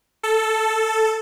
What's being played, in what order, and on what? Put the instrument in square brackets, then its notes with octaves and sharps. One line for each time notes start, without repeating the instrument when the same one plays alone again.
[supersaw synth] A4